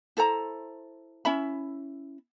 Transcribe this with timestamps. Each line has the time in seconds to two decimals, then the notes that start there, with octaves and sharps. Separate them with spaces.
0.17 E4 A4 C5 A#5
1.25 C#4 E4 E5 B5